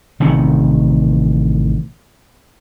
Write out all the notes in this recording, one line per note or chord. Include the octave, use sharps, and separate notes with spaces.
A1 C3 D#3 C#4